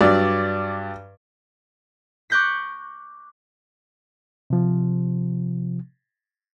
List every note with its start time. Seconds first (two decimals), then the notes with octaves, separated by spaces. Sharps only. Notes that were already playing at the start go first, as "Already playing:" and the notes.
0.01 G2 F#3 D5
2.30 C#6 D6 F#6 G6 A#6 B6
4.50 C3 F3